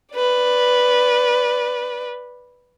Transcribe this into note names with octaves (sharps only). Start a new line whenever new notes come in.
B4 D5